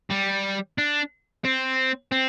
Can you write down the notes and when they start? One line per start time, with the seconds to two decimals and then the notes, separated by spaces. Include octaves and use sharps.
0.11 G3
0.78 D4
1.45 C4
2.12 C4